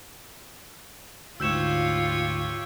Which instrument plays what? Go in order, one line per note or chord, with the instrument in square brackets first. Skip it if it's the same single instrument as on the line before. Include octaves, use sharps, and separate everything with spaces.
[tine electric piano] D2 G#2 [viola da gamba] F4 [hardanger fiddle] G4 C#5 [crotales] E6 G6 E7